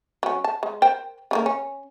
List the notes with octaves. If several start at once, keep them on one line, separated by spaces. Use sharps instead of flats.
F#3 C#4
A5
G#3
A#4 C5 G5
C#3 F3 A#3
C#4